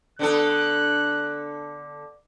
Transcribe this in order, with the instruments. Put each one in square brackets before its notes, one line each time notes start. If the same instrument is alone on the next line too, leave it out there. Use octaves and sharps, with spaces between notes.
[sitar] D3 B3 A4 [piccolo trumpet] F#6